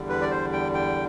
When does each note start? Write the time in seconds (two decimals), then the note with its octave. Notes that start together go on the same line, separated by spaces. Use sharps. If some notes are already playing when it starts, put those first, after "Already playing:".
Already playing: E2 D3 G3
0.09 B4
0.21 D5
0.31 C5
0.53 G5
0.74 G5